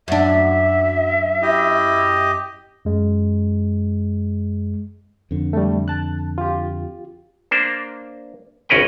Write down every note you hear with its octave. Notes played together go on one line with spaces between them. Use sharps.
F#2 D4 E5
E4 G4 D#5
F#2 G#3
F2 D3
G3 A3
A5 F#6
F4 G4
A#3 D4 C5
G#1 C#2 C#4 A#4 B4 G5